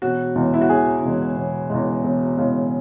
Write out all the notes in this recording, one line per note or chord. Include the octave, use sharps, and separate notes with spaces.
E1 F#4
E2 C#3 G#3
E4
F#4
E1 G#4
E2 C#3 G#3
E1
E2 C#3 G#3
E1
E2 C#3 G#3